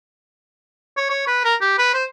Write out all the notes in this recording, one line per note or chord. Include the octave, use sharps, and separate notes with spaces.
C#5
C#5
B4
A#4
G4
B4
C5